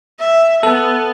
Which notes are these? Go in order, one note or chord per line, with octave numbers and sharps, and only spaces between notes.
E5
B3 A4